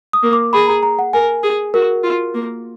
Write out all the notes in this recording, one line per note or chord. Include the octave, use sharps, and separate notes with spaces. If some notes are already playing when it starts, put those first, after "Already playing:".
D#6
A#3
D6
G#4 B5
A#5
A#5
F#5
A#4 G#5
G#4
F#4 A#4
F4
A#3